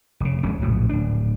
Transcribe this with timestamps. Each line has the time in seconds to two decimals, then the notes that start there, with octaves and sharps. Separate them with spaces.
0.20 F1 C#3
0.43 E2 G#3 C#4
0.61 A#1 A2 C#3 F#3
0.89 D1 D4